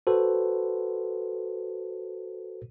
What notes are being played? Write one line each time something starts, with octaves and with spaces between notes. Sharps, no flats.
F#4 A4 B4 C5